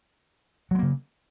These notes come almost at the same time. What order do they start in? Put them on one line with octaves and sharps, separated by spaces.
F#3 G#3 A#3 C#3